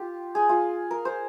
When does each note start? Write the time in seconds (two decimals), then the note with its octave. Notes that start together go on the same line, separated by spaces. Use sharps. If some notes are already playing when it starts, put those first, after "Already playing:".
Already playing: F4 G4
0.35 G#4
0.49 F4
0.91 A#4
1.05 C5